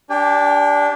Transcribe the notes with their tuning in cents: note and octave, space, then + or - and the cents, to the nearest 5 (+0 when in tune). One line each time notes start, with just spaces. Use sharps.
D4 -15 G4 +0 G5 +45